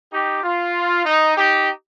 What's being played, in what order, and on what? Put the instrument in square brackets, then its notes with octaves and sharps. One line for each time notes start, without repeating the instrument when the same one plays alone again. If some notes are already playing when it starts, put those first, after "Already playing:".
[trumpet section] D#4 G4
F4
D#4
D#4 G4